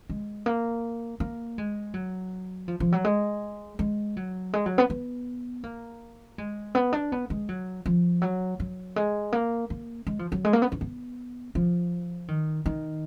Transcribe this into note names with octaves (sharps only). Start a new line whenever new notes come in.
G#3
A#3
A#3
G#3
F#3
F3
F3
F#3
G#3
G#3
F#3
G#3
F#3
B3
B3
A#3
G#3
B3
D4
B3
G#3
F#3
F3
F#3
F#3
G#3
A#3
A#3
G#3
F3
F#3
G#3
A#3
B3
D4
B3
F3
D#3
D#3